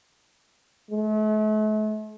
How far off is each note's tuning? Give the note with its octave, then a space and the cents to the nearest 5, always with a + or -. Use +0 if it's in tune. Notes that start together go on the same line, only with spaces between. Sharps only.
A3 -40